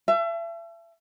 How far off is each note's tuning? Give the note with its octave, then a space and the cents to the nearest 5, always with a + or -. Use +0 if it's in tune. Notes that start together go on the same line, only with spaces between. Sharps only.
E5 +35 A5 -35